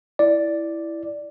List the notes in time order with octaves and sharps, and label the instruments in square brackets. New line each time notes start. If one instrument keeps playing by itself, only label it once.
[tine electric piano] E4 D5